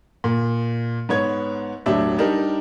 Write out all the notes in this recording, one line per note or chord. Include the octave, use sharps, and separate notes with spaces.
A#2
G#2 B3 C#5 G#6
E1 A2 F#3 D4 G4 E5
G3 D4 D#4 G4 A#4